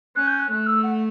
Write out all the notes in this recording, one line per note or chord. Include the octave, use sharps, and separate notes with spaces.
C#4 F#6
G6
F#6
A3 F#6
E6
F#5